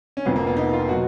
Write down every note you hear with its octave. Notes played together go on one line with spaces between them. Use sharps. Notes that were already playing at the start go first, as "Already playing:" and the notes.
C#4
F1 F2 F3 B3
A#3
B3
D#4
F4
B2 F#3 F#4